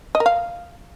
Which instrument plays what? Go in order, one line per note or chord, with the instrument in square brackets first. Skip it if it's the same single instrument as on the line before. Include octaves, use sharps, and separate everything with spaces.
[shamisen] D#5
A#4
F5